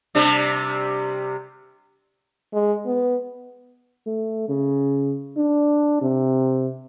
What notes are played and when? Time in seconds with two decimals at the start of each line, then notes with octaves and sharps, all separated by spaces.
0.15 C3 G3 D4
2.54 G#3
2.86 B3
4.07 A3
4.49 C#3
5.37 D4
6.02 C3